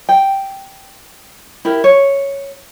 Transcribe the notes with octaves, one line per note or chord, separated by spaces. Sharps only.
G5
E4 G4 A#4
C#5